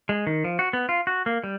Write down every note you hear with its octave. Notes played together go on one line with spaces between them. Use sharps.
G#3
D#3
F3
F#4
B3
F4
F#4
A#3
G3